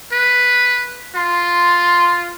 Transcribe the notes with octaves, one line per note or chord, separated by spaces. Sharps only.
B4
F4 C6